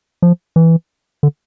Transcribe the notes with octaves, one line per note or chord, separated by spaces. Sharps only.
F3
E3
D3